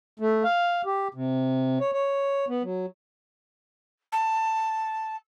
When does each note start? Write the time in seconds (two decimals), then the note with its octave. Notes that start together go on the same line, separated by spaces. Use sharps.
0.20 A3
0.44 F5
0.85 G4
1.14 C3
1.80 C#5
1.93 C#5
2.48 B3
2.63 F#3
4.12 A5